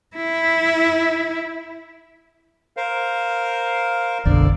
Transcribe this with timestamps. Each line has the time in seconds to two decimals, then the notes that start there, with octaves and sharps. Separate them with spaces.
0.16 E4
2.77 A#4 C5 F5
4.25 F#1 B1 D3 D5